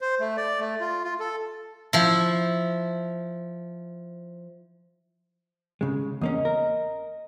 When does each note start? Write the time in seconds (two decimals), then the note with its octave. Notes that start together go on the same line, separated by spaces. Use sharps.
0.01 C5
0.20 A3
0.37 D5
0.60 A3
0.80 F4
1.04 F4
1.20 A4
1.93 F3 E4
5.81 C#3 G#3
6.21 E2 A#3 C#4 D#5
6.45 A#4